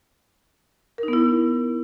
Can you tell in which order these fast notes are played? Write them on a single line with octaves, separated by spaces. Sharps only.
A#4 D#4 B3 E4